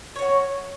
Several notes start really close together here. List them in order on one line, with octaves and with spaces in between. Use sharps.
C#5 C#4 F#4